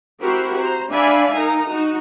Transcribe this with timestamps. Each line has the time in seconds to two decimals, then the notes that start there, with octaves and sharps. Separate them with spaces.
0.20 C4 E4 F#4 G4 A#4 C5
0.57 C5 A#5
0.91 D4 D5 E5 F5 G#5 B5
1.34 D#4 A#4 A#5
1.70 D#4 F#4